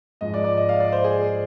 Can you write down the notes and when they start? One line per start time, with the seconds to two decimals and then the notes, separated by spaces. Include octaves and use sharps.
0.21 G#2 F3 G#3 D#5
0.34 D5
0.44 D5
0.57 D#5
0.69 F5
0.80 D5
0.92 C5
1.04 G#4